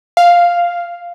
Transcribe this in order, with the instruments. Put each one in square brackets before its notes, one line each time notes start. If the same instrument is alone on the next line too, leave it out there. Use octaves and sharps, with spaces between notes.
[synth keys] F5